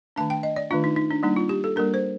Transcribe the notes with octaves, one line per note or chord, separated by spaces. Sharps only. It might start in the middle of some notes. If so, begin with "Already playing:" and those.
D#3 A3 D4 A5
G5
D#5
D5
D#3 A3 D4 F4
D#4
D#4
D4
G3 A#3 D4 D#4
F4
G4
A4
G3 A#3 D4 A#4
C5